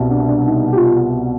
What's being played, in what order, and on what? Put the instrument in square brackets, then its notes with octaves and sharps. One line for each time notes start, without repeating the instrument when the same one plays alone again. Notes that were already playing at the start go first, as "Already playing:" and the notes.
Already playing: [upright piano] C2 B2
[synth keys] D4
D4
D#4
G4
F4